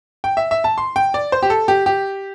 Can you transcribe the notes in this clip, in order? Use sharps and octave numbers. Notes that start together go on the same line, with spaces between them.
G5
E5
E5
A5
C6
G5
D5
C5
G4
A4
G4
G4